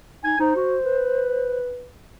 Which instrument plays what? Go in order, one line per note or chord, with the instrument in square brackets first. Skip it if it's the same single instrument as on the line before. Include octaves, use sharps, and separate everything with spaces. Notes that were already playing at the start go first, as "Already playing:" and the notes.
[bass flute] D#4 [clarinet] G#5
[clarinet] D#4 [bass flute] C5
[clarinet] F#4
B4